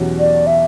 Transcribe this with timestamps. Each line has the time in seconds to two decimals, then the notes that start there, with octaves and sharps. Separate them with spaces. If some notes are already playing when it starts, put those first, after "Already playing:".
Already playing: E2 B2 F#3 C#4 G4
0.19 D5
0.47 E5